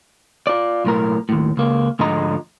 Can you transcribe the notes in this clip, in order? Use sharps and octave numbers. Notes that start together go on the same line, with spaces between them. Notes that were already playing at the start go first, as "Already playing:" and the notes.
F4 D5
B1 A2 A#4
D#2 A2
C#2 A#3
D2 G#2 D3 F3 D#5 A#5